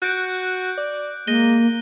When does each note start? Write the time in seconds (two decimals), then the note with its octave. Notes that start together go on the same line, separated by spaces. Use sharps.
0.02 F#4 F#6 G6 D7
0.78 D5
1.27 G#3 A#3 A#6 D#7 G7